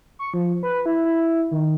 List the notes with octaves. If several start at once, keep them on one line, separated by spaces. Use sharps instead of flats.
C#6
F3
B4
E4
E4
D#3